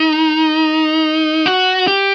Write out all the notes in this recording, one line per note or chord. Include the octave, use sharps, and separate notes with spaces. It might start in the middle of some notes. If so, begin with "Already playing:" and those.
Already playing: D#4
F#4
G4